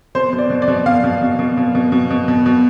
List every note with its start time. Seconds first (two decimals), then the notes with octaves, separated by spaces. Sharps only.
0.15 B2 C5
0.33 B2
0.38 D5
0.50 B2
0.62 D5
0.68 B2
0.86 B2 F5
1.04 B2
1.21 B2
1.39 B2
1.57 B2
1.75 B2
1.92 B2
2.10 B2
2.28 B2
2.46 B2